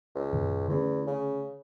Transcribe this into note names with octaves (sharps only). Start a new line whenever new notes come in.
C#2
F#2 A#2 D#3
E2 D3 A3 C#4
C#3